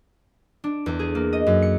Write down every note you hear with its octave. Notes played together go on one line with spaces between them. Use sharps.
D4
E2
G#4
A#3
D#5
F#2
C#7